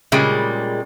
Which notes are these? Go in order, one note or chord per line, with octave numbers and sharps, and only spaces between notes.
A#2 C#3 G3 G#3